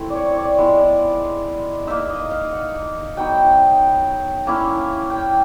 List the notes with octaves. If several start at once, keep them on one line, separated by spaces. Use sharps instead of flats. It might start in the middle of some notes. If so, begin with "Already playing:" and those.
Already playing: A3 C4 E4
D5
C#5
D5
F3 G#3 B3 E4 D5
A#3 D#4 E5
D#5
F5
F#5
F#3 B3 D#4 G5
A#3 C#4 E4
G5